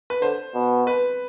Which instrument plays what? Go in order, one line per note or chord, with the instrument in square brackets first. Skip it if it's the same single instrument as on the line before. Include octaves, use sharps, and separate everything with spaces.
[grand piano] B4
[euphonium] D3 [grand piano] C5
[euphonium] B2
[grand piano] B4